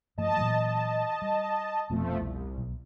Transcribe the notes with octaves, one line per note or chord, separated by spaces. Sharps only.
G2 F3 A3 D#5 A5
A#2 E3 F#3
G3
F1 F2 B2 F3 A3
C2
B1